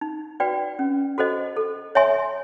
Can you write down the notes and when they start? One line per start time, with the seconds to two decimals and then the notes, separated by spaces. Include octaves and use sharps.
0.01 D#4
0.40 F#4 B4 D5 G5
0.79 C#4
1.18 F#4 A4 C5 D#5
1.56 A4
1.95 C#5 E5 G#5 C6